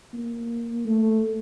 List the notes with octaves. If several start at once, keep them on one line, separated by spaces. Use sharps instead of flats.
A#3
A3